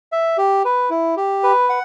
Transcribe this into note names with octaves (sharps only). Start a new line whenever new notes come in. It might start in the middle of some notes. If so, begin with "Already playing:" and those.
E5
G4
B4
E4
G4
B4
F#5